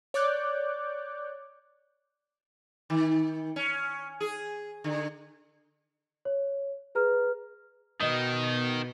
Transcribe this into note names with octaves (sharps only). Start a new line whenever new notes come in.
C#5 D5 D6 F#6 G6
D#3
C#4
G#4
D3
C#5
G#4 B4 A#5 F6
B2 D#3 D#5 D#6